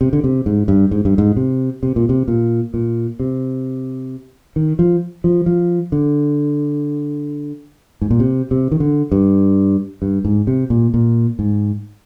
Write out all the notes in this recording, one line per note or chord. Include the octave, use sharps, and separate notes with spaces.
C3
D3
C3
G#2
G2
G#2
G2
G#2
C3
C3
A#2
C3
A#2
A#2
C3
D#3
F3
F3
F3
D3
G#2
A#2
C3
C3
D#3
D3
G2
G2
G#2
C3
A#2
A#2
G#2